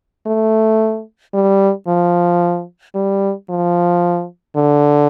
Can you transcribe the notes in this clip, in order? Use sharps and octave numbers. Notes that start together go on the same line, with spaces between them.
A3
G3
F3
G3
F3
D3